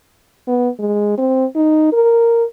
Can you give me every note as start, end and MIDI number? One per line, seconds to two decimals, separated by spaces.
0.47 0.69 59
0.79 1.18 56
1.18 1.45 60
1.55 1.92 63
1.93 2.44 70